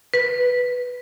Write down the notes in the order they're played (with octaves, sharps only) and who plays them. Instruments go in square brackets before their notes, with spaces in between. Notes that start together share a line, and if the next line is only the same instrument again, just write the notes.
[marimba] B4